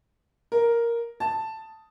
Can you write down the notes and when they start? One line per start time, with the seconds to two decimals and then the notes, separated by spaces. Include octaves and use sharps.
0.52 A#4
1.20 A5